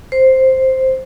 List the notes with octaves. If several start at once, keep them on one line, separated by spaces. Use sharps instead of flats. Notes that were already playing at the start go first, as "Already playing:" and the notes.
C5